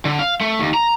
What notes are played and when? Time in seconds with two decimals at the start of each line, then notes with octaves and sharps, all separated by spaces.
0.05 D3
0.19 F5
0.41 A3
0.59 D#2
0.74 A#5